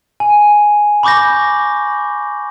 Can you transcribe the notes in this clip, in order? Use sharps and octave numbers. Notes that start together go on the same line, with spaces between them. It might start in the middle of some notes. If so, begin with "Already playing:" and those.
G#5
B5 C#6 D6 G6 A#6